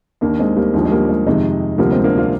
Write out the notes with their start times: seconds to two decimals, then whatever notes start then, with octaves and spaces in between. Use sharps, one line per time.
0.21 D#2 D#3 A#3 D4
0.39 G#3 C4
0.56 G3 A#3
0.74 D#2 D3 F3 G#3
0.85 G#3
0.91 G3 A#3
1.09 G#3
1.27 F2 C3 D#3 G#3
1.78 D2 C3 F3 G3 A#3
1.92 G#3 C4
2.04 A#3 D4
2.17 D4 F4